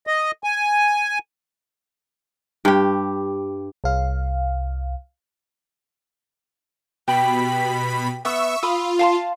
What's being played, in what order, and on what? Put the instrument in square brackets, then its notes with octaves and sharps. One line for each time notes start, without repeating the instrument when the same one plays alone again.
[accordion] D#5
G#5
[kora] G2 G4
[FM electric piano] C2 F5
[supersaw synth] B2 B5 B6 [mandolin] G4
[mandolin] B3 [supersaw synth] E5 C#6 E6
[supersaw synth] F4 [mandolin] B5 D#6 E6
[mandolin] F5 A5 C6